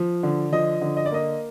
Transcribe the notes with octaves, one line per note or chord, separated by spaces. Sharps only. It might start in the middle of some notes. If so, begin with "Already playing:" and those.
Already playing: F3
D3
F3 D#5
D3
D#5
D5
A#3 D#5